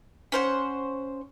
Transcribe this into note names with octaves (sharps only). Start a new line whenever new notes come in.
C#4 C5 F#5